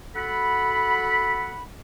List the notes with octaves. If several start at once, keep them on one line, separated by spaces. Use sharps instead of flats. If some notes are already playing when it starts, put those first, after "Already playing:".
F#4 A4 F#5 B5